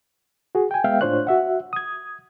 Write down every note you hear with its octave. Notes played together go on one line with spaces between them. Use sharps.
F#4 G#4
G5 G#5
G#3 B3 E5 F5 G5
A2 D4 F4 C5 C#5 F#6
F#4 E5 F#5
D#6 G#6